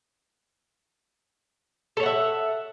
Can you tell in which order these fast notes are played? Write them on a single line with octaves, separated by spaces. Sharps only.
A4 C#5 F#5 E5